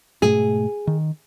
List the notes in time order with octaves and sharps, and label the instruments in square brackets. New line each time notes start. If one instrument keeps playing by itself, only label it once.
[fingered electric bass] G#2 B2 A3 [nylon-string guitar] G#4
[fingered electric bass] D#3